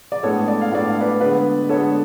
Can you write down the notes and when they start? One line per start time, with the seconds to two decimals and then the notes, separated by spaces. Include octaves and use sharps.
0.12 D5
0.23 A2 G#3 B3 D4 A4 C#5
0.48 D5
0.61 F5
0.71 A2 G#3 B3 D4 D5
0.88 F5
1.01 B4 D5
1.20 D3 G#3 B3 B4 D5
1.69 D3 G#3 B3 A4 C#5